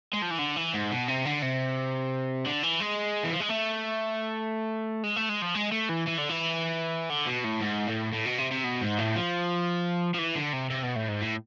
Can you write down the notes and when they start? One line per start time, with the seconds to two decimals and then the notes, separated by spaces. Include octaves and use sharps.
0.13 G#3
0.22 F3
0.31 E3
0.39 D3
0.57 E3
0.74 G#2
0.91 B2
1.08 C3
1.25 D3
1.42 C3
2.46 D3
2.63 E3
2.80 G#3
3.24 E3
3.32 F3
3.40 G#3
3.49 A3
5.03 G#3
5.16 A3
5.29 G#3
5.42 F3
5.55 G#3
5.72 A3
5.89 E3
6.07 E3
6.18 D3
6.29 E3
7.10 D3
7.26 B2
7.44 A2
7.61 G#2
7.87 A2
8.13 A2
8.25 B2
8.38 C3
8.51 C3
8.64 B2
8.81 G#2
8.98 A2
9.16 F3
10.14 F3
10.18 E3
10.35 D3
10.53 C3
10.70 C3
10.83 B2
10.96 A2
11.08 G#2
11.22 A2